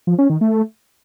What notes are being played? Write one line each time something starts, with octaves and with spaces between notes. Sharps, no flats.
F3
C#4
D#3
A3